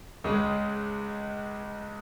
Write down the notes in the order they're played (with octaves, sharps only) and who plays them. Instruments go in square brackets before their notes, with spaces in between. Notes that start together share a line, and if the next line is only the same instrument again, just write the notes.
[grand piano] C#2 C#3 G#3